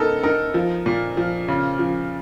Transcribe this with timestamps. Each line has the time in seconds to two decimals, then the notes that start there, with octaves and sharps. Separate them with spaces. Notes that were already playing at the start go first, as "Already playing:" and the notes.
Already playing: C3 B3 D#4 A4 A#4
0.23 D#4 A#4
0.54 F3
0.86 A#2
1.17 F3
1.48 C#3
1.79 F3